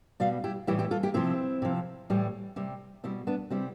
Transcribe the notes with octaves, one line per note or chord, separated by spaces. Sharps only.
B2 G3 D5 F5
E4 G4
A2 E3 G3 E4 G4
E4 G4
F4 A4
E4 G4
C3 F3 C4 E4
C3 F3
A2 E3 G3
C3 G3
B2 G3 C4 E4
B3 D4
C3 G3 C4 E4